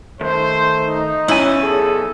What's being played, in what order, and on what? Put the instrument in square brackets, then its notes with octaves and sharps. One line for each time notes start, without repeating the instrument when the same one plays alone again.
[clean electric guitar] D#3 [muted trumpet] A3 [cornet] C5
[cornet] D#4
[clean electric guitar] B1 G#5 [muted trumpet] C#4 [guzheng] E4
[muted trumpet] G#4 [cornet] A4